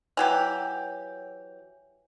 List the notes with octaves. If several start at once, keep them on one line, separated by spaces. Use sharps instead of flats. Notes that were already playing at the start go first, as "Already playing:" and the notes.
E3 F#3 G4